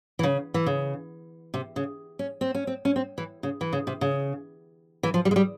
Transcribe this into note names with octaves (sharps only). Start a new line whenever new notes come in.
E3
C#3
E3
C#3
C3
C#3
C#4
C4
C#4
C4
C#4
C4
E3
C#3
E3
C#3
C3
C#3
E3
F3
G3
G#3
G3